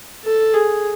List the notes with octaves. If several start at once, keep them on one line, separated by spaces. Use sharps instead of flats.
A4
G#4